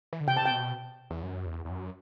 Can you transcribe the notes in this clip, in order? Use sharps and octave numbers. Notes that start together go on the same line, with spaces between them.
E3
D3
C3 G5
A5
C3 G5
B2
E2
F#2
E2
E2
F#2